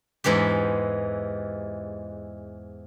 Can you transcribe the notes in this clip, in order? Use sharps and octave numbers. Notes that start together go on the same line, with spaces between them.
E2 G#2 E3 G#3 G4